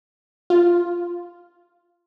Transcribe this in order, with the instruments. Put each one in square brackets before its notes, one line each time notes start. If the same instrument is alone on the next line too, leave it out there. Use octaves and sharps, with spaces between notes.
[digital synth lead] F4